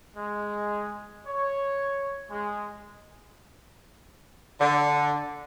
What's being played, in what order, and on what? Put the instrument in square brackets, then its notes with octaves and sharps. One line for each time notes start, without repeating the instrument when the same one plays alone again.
[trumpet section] G#3
C#5
G#3
[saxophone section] D3